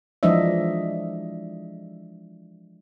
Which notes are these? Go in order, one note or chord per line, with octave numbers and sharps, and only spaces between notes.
E3 F3 G#3 D4 D#5 E5